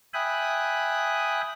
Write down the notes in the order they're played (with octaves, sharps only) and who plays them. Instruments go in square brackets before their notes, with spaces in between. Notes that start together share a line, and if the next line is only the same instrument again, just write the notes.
[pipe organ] E5 G5 G#5 B5 D#6 F#6